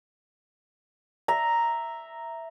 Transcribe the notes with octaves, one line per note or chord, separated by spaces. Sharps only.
E5 A#5